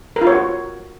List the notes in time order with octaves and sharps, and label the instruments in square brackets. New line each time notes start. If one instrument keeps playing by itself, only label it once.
[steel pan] A#4
F4
C#5
F#4